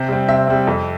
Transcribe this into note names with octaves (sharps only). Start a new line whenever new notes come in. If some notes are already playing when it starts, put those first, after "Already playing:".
Already playing: C3 C5
G3 C4
C3 E5
G3 C4
F2